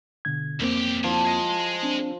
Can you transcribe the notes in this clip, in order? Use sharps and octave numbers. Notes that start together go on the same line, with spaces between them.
B2 D3 G#6
B1 F2 A#3 C4 G4
F3 D5 G#5
G#4 D#5
C4 D4